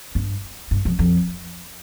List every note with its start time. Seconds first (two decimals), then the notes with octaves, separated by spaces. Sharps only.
0.15 G2
0.71 G2
0.85 F2
0.99 F2